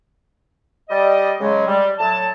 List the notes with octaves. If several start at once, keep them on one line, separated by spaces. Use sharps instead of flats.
G3 D5 D#5
C#3 F#3 G#3
G3
A2 F#3 A5